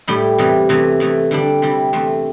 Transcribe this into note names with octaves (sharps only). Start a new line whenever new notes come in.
A2 G3 E4 G4
E2 C3 E3 G3
E2 C3 E3 A3
E2 E3 A3
D3 G3 D4 G4
C3 G3 E4 G4
E2 C3 A3 C4